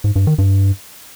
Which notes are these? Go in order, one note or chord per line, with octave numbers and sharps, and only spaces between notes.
G#2
G2
D#3
G2